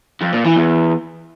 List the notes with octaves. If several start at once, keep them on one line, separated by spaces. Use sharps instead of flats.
F2
A#2
E3
E2